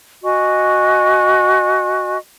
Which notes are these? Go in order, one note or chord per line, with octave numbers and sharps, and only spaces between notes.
F#4 D#5 G#5 C#6